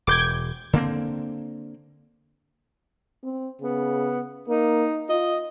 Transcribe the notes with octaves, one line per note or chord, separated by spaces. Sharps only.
E1 D6 G6 G#6
D3 A#3 C4
C4
C#3 B3
A#3 D#4
F4 D#5